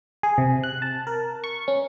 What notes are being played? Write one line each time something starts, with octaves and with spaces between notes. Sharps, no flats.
G#4
C3
F#6
A5
A#4
C#6
C#4